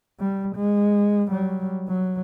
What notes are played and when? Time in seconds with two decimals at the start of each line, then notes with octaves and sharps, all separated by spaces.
0.20 G3
0.56 G#3
1.28 F#3 G3
1.88 F#3